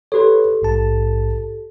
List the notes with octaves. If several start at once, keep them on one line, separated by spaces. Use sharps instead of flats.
G4 A4 B4 C#5
A#1 G#2 A5